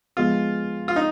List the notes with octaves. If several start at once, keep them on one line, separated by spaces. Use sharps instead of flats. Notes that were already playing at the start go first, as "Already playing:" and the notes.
F3 G#3 B3 F4
F4
D#4